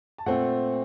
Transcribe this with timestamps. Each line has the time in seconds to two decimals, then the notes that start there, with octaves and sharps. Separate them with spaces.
0.18 A5
0.26 A#2 A3 C4 F#5